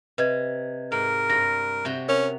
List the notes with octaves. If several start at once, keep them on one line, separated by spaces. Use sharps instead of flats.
C3 B4 D#5 G#6
G#2 A#4
G2 A#6
C3 F#4 G5
C#4 A#4 F7